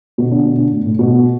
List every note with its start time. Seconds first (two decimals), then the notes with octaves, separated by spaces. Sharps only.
0.18 B2
0.31 D3
0.45 B2
0.58 D3
0.72 A2
0.86 A2
0.99 B2